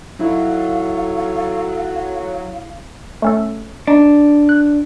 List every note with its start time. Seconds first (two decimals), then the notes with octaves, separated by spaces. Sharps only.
0.19 F#3 D#4 E4 A4 F5
3.22 A3 C#4 A4
3.87 D4 D#4
4.49 F#6